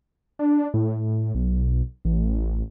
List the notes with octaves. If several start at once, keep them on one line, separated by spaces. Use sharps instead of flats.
D4
A2
B1
A1